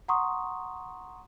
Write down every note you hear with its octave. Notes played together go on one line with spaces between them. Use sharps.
F#5 A#5 C6 C#6 D#6